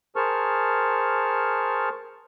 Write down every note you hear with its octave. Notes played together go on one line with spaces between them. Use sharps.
G#4 A#4 C5 A5 C#6 F6